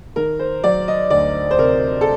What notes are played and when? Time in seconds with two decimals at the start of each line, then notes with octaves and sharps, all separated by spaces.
0.16 D#3 A#4
0.39 C5
0.64 F#3 D5
0.88 D#5
1.10 D2 D5
1.51 C5
1.58 C3 A#4
2.01 A4